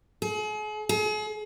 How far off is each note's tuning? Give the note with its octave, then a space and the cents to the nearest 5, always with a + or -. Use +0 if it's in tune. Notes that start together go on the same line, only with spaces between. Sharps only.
G#4 +40
G#4 +40